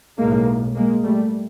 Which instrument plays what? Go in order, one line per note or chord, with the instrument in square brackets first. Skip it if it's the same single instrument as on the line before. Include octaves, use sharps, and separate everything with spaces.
[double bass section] B1 A2 G#3 A#3
G#3 A#3
G3 A3